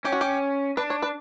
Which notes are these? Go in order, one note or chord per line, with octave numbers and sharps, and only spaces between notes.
C#4 G4
F#4
G4
D4 B4
C#5
B4